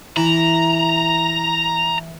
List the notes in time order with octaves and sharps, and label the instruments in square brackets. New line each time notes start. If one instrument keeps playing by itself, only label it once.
[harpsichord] E3 [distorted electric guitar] A#5